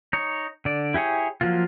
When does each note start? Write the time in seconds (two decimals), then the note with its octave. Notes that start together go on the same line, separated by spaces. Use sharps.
0.13 D#4 C#5
0.65 D3 D5
0.94 E4 G4 G#4 C#5
1.41 F3 F#3 A#3 F4